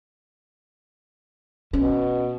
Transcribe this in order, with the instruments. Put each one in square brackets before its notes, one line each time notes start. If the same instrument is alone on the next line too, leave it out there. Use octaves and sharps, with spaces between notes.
[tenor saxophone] B2 [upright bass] C#4